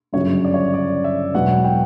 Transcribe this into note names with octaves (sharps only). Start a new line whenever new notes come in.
G1 F#2 C#3 F#3 C#5
D5
C#5
D5
E5
E1 E2 B2 F#3 F#5
G5